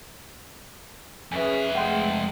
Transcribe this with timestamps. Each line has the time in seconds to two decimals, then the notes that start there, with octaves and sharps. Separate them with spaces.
1.32 F2 C#4 G#4 B4 E5 G#5
1.75 G#3 A3 F#5 G5 C6